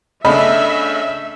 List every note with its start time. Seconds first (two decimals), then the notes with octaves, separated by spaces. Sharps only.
0.25 C#3 A3 D4 D#5 E5 B5